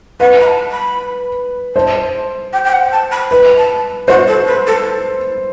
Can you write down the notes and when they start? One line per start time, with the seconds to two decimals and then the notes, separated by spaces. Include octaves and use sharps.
0.20 B4 F#5
0.40 B5
0.46 A5
0.71 B5
1.75 C5 A5
2.53 G5
2.64 G5
2.72 F#5
2.92 A5
3.11 B5
3.30 B4 B5
3.57 A5
4.08 F#4 C5
4.27 A4
4.47 B4
4.67 A4